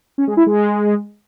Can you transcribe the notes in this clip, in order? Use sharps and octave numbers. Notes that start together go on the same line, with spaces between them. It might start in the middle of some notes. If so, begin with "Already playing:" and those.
C#4
G#3
E4
G#3